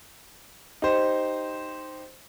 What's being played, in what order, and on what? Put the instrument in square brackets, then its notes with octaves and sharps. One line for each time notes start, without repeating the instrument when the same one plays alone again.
[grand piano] D#4 G4 C5